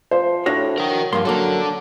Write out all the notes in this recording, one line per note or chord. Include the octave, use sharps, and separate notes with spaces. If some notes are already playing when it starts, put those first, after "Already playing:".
F3 C5
A2 D4 F#4 C#5 A#6
F#3 A#4 G5
G2 F3 A#3 C6
F#2 F#3 A#3 D4 A4